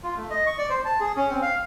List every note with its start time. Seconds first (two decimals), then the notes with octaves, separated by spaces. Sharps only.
0.03 F4
0.16 A3
0.30 D#5
0.46 C#6
0.58 D5
0.70 C5
0.85 A5
1.00 G#4
1.17 C#4
1.30 C4
1.42 F5